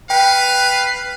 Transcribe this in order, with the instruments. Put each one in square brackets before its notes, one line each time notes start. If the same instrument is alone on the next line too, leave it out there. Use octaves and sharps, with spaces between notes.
[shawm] B4 [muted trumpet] F5 [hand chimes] G5